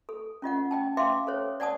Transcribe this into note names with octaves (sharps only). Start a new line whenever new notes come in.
A4
C#4 F4 D#5 F#5
D#5 G5 A5
E5 F5 G5 C6 D6
A4 C5 C#5
D5 F#5 G#5 A5 D#6